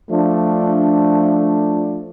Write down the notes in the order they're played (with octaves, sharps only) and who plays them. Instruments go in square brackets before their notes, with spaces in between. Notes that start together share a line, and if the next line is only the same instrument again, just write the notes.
[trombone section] F3 A3 D4